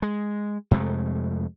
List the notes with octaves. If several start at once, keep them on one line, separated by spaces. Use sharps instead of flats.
G#3
F2 C3 G#3 A3